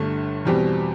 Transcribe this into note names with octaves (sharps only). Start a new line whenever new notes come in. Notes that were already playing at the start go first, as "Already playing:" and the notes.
Already playing: G1 G2 D3 A3
E2 B2 G3 C4 G4